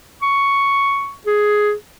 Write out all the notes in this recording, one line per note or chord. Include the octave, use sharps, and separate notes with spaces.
C#6
G#4